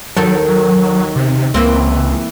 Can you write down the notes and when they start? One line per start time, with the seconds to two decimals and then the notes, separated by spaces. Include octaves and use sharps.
0.17 D#2 D#3 F#3 A4
1.16 C3
1.54 C#2 E3 A#3 C4